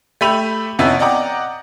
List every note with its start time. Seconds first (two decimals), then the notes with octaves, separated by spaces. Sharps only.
0.21 A3 G4 E5 B5 D#7 F7
0.79 F2 C3 B3 C#4 E4
0.99 D5 D#5 F#5 G5 A#5 D6